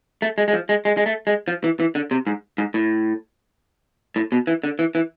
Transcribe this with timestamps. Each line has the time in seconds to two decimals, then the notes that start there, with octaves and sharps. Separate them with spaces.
0.22 A3
0.38 G#3
0.48 G#3
0.53 F3
0.69 G#3
0.85 G#3
0.97 G#3
1.06 A3
1.27 G#3
1.48 F3
1.64 E3
1.80 E3
1.95 D3
2.11 C3
2.27 G#2
2.58 G#2
2.74 A2
4.16 A2
4.32 B2
4.47 E3
4.64 D3
4.79 E3
4.95 E3